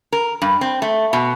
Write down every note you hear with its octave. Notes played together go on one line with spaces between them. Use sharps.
A#4
G2
C4
A3
B2